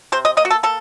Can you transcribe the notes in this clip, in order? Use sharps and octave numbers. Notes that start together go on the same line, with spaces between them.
C3 C5
D#5
A#3 D#5
F#4
A4
A#3 A4